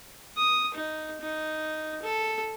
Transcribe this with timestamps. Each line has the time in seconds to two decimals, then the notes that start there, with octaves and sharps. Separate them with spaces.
0.37 D#6
0.74 D#4
1.21 D#4
2.02 A4